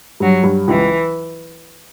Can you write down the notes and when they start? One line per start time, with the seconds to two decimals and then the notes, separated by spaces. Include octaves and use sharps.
0.20 G2 F#3
0.44 G2
0.67 C#2 E3